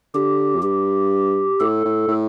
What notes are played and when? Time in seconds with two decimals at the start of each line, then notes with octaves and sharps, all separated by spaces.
0.14 D3 G4
0.56 F2
0.62 G2 G4
1.60 A2 A4
1.85 A2
2.08 A2